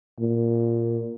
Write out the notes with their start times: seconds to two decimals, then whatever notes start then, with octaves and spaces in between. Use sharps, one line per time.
0.20 A#2